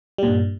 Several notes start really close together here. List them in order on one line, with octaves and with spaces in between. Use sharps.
G3 A#2 G2